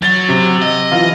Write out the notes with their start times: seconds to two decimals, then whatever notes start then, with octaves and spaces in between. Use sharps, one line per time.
0.02 F#3 A6 G7
0.28 C3
0.61 D#5
0.91 E3 F4